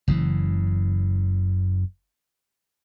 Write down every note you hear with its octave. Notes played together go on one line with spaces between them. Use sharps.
F#1 C#3 E3